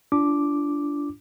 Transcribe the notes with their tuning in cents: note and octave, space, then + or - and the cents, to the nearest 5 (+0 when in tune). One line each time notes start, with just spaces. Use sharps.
D4 -20 F4 -40 D6 +0